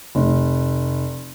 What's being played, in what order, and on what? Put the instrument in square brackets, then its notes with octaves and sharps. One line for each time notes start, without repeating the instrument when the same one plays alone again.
[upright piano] F1